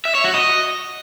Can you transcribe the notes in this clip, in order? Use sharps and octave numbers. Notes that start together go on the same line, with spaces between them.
E5
C#5
F#4
D#5